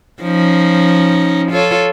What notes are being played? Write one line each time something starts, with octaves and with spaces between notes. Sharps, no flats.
F3 C#4 D#4
F4 A4 C#5